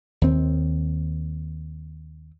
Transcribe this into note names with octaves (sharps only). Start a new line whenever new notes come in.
D#2 C4